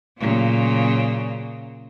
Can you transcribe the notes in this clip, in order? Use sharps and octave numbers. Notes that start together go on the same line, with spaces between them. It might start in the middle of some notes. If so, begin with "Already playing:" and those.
A#2 C#3 F#3